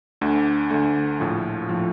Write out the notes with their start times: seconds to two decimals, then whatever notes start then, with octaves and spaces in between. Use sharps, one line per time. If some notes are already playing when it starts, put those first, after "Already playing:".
0.21 D2 D3 A3
0.70 D2 D3 A3
1.20 A#1 A2 F3
1.69 A2 F3